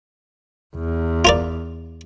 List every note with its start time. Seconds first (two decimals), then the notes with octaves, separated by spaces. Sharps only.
0.75 E2
1.25 F4 A#4 D5